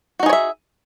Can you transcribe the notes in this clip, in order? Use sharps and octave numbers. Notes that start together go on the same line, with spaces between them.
D#4 F#4 G#4 C#5 E5